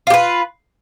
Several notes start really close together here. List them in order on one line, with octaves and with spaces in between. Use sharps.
F4 G4 B4